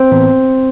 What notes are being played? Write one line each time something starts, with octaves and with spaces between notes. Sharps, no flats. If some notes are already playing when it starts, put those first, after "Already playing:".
Already playing: C4 C5
A2 E3 B3